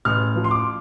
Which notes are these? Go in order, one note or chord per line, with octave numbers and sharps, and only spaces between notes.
A1 F6
F3
C6
D6